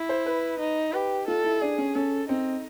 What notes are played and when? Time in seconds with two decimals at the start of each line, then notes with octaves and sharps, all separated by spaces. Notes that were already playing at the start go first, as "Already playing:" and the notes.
Already playing: E4
0.09 C5
0.26 B4
0.59 D#4
0.93 G4 B4
1.27 F4 A4
1.44 E4
1.61 D4 G#4
1.78 C#4
1.95 C#4 A4
2.28 C4 D#4